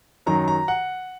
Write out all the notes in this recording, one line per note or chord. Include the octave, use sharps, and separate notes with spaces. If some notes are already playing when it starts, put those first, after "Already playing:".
F#2 D#3 F#3 A#5
A#5
F#5